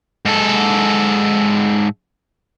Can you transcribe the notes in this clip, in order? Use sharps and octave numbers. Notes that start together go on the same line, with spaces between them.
G#2 A4